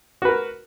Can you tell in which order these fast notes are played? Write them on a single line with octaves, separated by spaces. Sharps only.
F#4 B4 A#4